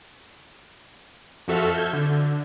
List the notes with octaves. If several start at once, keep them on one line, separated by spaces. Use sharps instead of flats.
F2 F3 F#4 A4 E5 F6
G6 G#6
D3